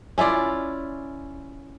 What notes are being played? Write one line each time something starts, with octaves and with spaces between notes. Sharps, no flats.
C#4 E4 F4 D5